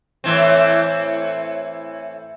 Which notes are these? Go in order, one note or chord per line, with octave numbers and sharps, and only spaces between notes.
A2 E3 C4